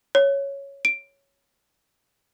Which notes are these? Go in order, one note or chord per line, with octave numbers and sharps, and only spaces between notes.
C#5
D7